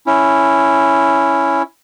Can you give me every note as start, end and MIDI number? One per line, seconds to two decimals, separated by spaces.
0.07 1.62 61
0.07 1.62 64